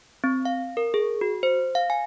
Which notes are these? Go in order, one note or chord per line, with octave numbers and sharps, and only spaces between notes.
C4
F5
A#4
G#4
F#4
C5
F5
G#5